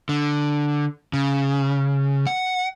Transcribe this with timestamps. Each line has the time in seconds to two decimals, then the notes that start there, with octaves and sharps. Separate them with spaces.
0.09 D3
1.13 C#3
2.27 F#5